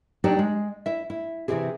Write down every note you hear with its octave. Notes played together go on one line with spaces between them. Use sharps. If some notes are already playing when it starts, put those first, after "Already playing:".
F#3 D4 D#4 G4 C#5 D5
G#3
E4 E5
E4
C3 E3 C4 E4 G4 G#4